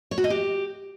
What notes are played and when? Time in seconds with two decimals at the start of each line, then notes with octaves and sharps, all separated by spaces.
0.11 C#5
0.18 F#4
0.24 D#5
0.30 G4